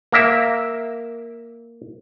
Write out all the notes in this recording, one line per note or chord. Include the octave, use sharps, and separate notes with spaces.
A#3 A#4 E5